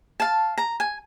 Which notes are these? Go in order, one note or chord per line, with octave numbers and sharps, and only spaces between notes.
F5 A5
A#5
G#5